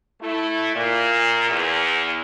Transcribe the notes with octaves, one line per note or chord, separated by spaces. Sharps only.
A3 E4
A#2
E2